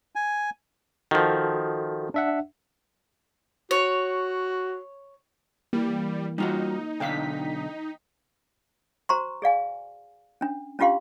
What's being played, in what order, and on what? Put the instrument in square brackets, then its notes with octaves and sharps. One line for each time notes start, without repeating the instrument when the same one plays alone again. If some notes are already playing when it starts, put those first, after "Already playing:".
[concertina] G#5
[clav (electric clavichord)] D#3 F3 [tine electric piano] F#4 A4
[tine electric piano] D4 E5 F#5
[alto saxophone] F#4 [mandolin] C#5
[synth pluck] E3 A#3 [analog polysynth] G3
[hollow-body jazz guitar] G3 F4 F#4 [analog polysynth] D#4
[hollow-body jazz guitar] B1 D3 F5 [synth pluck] G5 B6
[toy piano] F#4 C5 A#5 C6 C#6
G#4 D5 F5 G#5
C#4 D4
C#4 D4 F4 G4 F5 C6